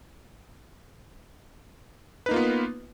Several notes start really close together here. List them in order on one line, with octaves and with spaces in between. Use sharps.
B4 D#4 A#3 F4 B3